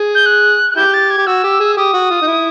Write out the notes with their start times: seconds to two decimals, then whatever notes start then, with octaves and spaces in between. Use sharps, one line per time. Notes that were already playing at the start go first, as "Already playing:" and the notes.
Already playing: G#4
0.15 G6
0.26 F#6
0.71 F#6
0.76 E4 G4 G6
0.94 A6
1.10 G#6
1.18 G4
1.27 F#4 E6
1.44 G4
1.60 G#4
1.77 G4 D#6
1.94 F#4
2.10 F4
2.22 D#4
2.27 E4